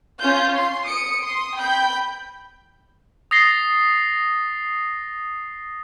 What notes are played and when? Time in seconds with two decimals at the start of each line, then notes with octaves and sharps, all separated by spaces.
0.20 C#4 F4 G6
0.54 C6
0.87 D#6 C#7 D7
1.22 C6 D#6
1.58 G5 B5 G6
3.31 D#6 A6 A#6 C7 G7